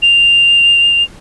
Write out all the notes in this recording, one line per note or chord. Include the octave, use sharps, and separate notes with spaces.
F7